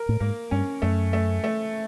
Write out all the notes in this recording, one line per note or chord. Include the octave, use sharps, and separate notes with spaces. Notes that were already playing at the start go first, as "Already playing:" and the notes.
Already playing: A#4
A2
G#2 A#3
G2 C#4
F#2 A3
A3
A3